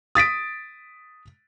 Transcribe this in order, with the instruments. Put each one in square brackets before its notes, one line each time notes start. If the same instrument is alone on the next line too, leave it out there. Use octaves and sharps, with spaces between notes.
[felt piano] D#6 A6 B6 D7